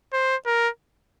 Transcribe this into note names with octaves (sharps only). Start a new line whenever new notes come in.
C5
A#4